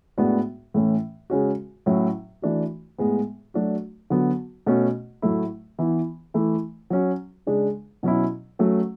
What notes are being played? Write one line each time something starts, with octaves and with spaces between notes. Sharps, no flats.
A2 G#3 B3 D4 F#4
A2 E3 A3 C#4
C#3 G#3 C#4 F#4
A2 F#3 C#4 E4
E3 A3 D4 F#4
A2 G#3 B3
F#3 A3 D4 F#4
D3 F#3 B3 F#4
B2 A3 C#4 F#4
A2 F#3 A3 E4
E3 B3 E4
E3 A3 E4
F#3 C#4 F#4
C#3 G#3 D4
B2 F#3 C#4 E4
F#3 A3 C#4 F#4